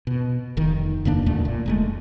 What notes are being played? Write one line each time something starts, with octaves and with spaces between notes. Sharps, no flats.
B2
F1 D#3
F2 C#3 A#3 D4
D#1 D2 A#2 A3
A#2
F1 G#3 A3